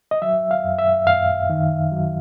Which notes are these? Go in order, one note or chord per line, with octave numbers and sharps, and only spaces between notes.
D#5
F#3 E5
F5
F#2
E5
F#2 F5
D#3
F#3